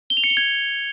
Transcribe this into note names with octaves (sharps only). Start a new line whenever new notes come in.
G7
F7
C#7
G7
G#6